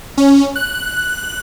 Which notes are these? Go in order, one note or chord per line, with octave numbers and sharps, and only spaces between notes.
C#4
F#6